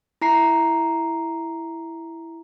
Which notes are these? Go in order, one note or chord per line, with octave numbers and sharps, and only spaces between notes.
E4 A#5 C7